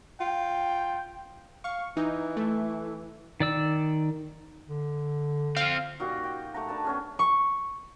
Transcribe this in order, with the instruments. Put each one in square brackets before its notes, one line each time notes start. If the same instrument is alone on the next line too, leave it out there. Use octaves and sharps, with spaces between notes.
[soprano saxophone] F4 [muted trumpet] G5
[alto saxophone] F5 [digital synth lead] C#6
[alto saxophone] E3 [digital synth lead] D#4
[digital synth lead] A3
[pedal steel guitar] D#3 D5 E6
[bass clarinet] D3
[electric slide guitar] C4 F4 [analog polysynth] F5
[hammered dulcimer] A#2 D#4 F#4 G4
G5
A3 G4 F#5 A#5
D4 B4 A5
B3 C#4 G#4
[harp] C#6